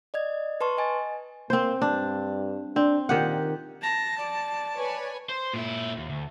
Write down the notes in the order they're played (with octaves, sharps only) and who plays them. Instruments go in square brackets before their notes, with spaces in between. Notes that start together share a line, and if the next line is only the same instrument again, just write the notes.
[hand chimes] D5 D#5 G#6
B4 A5 C6 C#6
D#5 G#5 A6
[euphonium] A#3 [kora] C4 C5
[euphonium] G2 [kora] D4
[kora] C4 [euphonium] D4
[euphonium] A#2 [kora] D#3 G4 F#5
[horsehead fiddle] A5 [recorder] A#6
[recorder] D5
[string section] B4 C#5 G#5
[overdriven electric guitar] C5
A#2 E4
D#2
D2